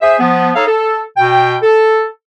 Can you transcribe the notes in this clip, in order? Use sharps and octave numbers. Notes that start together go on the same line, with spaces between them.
G#4 C5 E5
F3 B3
D#4 A4 C#5 F5 A#5
A4
B2 G5
A4